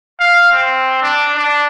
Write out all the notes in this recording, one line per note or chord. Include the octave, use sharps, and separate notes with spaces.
F5
C4
D4
D4